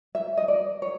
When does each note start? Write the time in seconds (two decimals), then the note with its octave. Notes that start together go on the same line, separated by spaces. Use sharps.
0.15 E5
0.37 D#5
0.48 D5
0.82 C#5